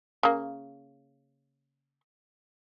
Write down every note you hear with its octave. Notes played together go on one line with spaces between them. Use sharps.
C#3 A#3